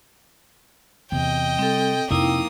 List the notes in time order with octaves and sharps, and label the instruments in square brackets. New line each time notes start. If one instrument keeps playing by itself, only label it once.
[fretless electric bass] E2 [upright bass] C3 [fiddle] D#5 G5
[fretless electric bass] G3 [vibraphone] C4 A4
[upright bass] F2 [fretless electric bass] C3 [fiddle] A#3 D#6 [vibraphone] D#4 E4 G5